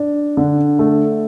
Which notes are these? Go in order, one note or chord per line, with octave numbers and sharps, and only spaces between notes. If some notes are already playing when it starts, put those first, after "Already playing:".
Already playing: D4
D3
A3